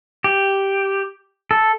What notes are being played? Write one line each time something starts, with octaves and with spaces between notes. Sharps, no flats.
G4
A4